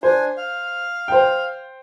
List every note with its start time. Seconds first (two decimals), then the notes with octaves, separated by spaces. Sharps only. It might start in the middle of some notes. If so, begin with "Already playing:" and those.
0.03 D4 C5 G#5
0.37 F5
1.08 C5 G5